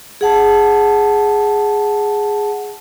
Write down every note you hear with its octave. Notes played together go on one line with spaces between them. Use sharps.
G#4 F#5 A5